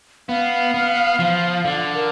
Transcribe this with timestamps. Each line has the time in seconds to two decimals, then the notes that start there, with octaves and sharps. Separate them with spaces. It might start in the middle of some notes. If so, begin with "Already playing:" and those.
0.29 B3 F5
0.74 B3
1.19 F3
1.65 D3
1.94 A#4